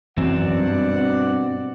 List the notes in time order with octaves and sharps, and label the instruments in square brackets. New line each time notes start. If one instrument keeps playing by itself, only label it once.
[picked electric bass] F#2 E3 F#3 [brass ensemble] B2 D5 F#5 [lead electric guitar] C4
[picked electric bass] G2